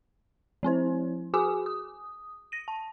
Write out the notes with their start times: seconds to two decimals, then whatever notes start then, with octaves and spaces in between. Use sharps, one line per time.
0.63 F3 C4 E4 C5
1.34 F#4 G#4 G#5 D6 D#6
1.66 D#6
2.52 A#6 D#7
2.68 A5